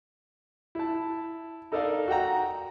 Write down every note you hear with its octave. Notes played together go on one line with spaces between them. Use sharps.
E4 A5
D#4 A4 A#4 D5 D#5 F5
F#4 F#5 G5 A#5